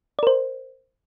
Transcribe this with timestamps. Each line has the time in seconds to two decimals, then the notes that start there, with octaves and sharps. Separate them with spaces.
0.19 D5
0.23 A#4
0.27 C5